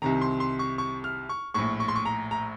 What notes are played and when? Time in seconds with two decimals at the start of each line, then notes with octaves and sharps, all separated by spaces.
0.02 C2 C3 D#3 A#5
0.21 C6
0.40 C6
0.59 C#6
0.78 C#6
1.04 F6
1.29 C#6
1.54 A#1 A2 C#6
1.80 C#6
1.88 C6
1.95 C#6
2.05 A#5
2.31 A#5